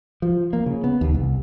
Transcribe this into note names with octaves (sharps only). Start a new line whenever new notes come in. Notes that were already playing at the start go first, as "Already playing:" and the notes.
F3
A#3
C#3
B3
D#2
C2